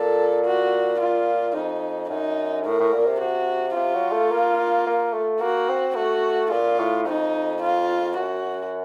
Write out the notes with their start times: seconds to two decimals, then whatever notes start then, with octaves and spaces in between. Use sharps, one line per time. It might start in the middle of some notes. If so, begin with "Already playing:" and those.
Already playing: A#2 A4
0.45 F#4
1.00 F4
1.54 F2 D#4
2.10 F#2 D#4
2.66 A2 A#4
2.80 A2
2.93 A#2
3.07 C3
3.21 C3 F#4
3.76 C3 F4
3.94 F#3
4.12 A3
4.31 A#3
4.86 A#3
5.13 A3
5.41 A#3 F#4
5.69 C4
5.96 A3 F#4
6.51 A#2 F4
6.79 A2
7.07 F2 D#4
7.62 F4
8.17 F#2 F#4